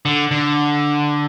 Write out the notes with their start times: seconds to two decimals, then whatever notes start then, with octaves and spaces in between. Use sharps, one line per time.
0.05 D3
0.31 D3